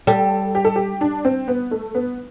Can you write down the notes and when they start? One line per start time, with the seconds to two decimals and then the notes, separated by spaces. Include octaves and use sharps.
0.07 G3 A4
0.55 G4
0.65 A4
0.76 G4
1.01 D4
1.25 C4
1.48 B3
1.71 A3
1.95 B3